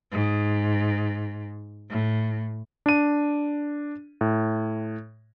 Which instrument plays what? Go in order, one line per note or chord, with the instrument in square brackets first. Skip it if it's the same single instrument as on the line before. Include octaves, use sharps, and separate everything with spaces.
[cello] G#2
A2
[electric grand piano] D4 D#7
A2